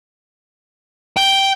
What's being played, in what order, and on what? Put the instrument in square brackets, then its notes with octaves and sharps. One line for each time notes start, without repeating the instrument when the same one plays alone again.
[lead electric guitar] G5 [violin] G6